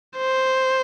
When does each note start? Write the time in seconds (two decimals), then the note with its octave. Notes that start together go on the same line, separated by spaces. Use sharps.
0.18 C5